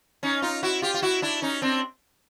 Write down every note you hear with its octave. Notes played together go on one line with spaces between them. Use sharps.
C#4 D#4
D#4 F4
E4 F#4
F4 G4
F4
E4 F#4
D4 E4
C#4 D#4
C4 D4